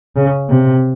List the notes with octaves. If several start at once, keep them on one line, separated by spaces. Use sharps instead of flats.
C#3
C3